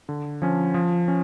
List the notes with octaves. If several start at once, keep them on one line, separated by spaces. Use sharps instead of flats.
D3
F3 C#4
F3
C#4